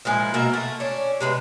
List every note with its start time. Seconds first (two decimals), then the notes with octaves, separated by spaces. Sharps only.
0.05 A#2 F3 G#3 E4
0.34 B2 A#3 D#5 E5
0.54 A3
0.80 C#4 D4
1.21 C3 G#3 G#4 B4